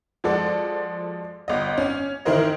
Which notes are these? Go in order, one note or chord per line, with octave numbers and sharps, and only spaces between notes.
F3 G#3 F#4 A4 D5
G1 D#5
C#4
D#3 E3 E4 A#4 C5 D#5